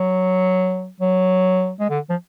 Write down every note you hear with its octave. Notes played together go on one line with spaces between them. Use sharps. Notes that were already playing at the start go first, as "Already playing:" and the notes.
Already playing: F#3
F#3
G#3
D3
F3